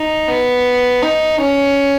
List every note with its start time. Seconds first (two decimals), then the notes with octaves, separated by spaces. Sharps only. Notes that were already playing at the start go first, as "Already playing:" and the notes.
Already playing: D#4
0.28 B3
1.03 D#4
1.40 C#4